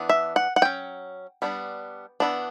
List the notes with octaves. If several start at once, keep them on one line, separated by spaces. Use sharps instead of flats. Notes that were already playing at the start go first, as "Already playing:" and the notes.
Already playing: E3 B3 D4
E5
F#5
F#5
F#3 C#4 G5
G3 B3 D4
E3 B3 D4